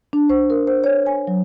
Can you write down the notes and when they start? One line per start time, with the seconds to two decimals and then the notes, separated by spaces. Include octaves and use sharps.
0.13 D4
0.29 C5
0.50 A#4
0.67 C5
0.84 C#5
1.06 G#5
1.27 F#3